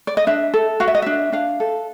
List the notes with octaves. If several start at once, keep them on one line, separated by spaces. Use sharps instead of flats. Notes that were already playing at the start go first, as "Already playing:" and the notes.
D5
D#5
D4 E5
A4
F#4 F5
E5
D#5
D4 E5
D4 F5
A4